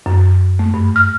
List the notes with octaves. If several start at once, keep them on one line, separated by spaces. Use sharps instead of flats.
F#2
A3
G2
F6